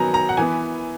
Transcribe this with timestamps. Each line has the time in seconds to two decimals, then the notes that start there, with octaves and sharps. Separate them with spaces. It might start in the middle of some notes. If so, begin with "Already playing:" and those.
Already playing: D#3 F#3 B3 G#5 A#5
0.14 A#5
0.29 F#5
0.37 E3 B3 G#5